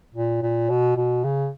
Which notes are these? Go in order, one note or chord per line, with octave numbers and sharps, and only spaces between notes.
A#2
A#2
B2
B2
C#3